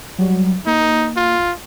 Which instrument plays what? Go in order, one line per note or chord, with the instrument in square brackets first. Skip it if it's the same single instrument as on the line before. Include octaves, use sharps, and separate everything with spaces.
[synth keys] F#3 G3
[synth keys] A#3 [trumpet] D#4
[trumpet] F4